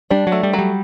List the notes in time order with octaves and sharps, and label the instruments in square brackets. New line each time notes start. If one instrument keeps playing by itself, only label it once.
[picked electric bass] G3 [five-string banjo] D4
[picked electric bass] F#3
[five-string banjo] A3
[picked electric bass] G3
[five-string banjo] F#3
[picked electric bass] G3